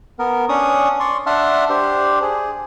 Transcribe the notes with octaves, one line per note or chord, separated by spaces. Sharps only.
B3 A#4
C#4 D4 C#6 D#6
D5 C6 C#6
D4 E5 F#5 A5 C6 F6
D4 G4 C5
G#4